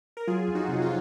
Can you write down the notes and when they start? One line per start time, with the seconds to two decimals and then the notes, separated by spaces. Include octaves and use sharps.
0.17 A#4
0.27 F#3 F4 G#4
0.48 F2
0.55 D#4 F#4
0.68 C3
0.82 F4